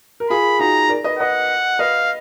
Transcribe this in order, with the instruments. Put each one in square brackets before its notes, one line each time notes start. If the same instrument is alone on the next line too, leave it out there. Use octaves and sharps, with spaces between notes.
[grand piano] A#4
[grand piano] F4 G#4 [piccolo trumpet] B5
[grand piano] D#4 F#4 [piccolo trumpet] A#5
[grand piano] A#4 D5
B4 D#5
[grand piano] B4 D#5 [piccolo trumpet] F#5
[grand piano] B4 D#5 [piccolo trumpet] F5